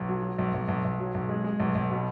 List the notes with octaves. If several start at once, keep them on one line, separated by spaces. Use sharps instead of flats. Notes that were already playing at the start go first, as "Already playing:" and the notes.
Already playing: B1
F#3
F#3
B1
B1
B1
B1
F#3
B1
G#3
G#3
B1
B1
B2